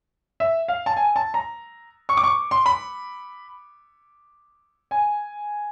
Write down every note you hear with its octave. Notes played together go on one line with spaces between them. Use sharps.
E5
F5
A5
G#5
A5
A#5
C#6
D6
C#6
C6
B5
G#5